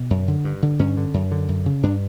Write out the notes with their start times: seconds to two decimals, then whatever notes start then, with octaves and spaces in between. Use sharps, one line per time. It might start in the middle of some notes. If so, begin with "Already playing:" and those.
Already playing: B2
0.10 F#2
0.28 D3
0.44 G2
0.62 D3
0.79 G2 C#4
0.97 D3
1.14 F#2
1.31 D3
1.49 F#2
1.66 C#3
1.83 G2 D4